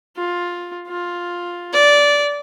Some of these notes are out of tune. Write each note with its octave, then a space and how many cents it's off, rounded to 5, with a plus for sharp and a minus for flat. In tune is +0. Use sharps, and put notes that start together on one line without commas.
F4 +10
F4 +5
D5 -15